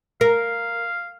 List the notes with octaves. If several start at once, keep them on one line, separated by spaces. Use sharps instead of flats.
A#4 F5